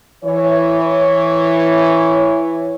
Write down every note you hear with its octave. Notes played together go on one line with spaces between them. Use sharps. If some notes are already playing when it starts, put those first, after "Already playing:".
E3 C#5